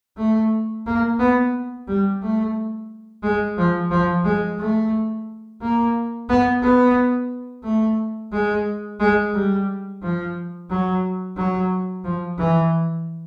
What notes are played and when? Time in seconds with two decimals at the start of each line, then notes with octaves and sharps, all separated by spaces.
0.17 A3
0.86 A#3
1.19 B3
1.87 G3
2.22 A3
3.23 G#3
3.58 F3
3.91 F3
4.24 G#3
4.59 A3
5.61 A#3
6.29 B3
6.62 B3
7.63 A3
8.32 G#3
9.00 G#3
9.34 G3
10.02 F3
10.70 F#3
11.36 F#3
12.04 F3
12.38 E3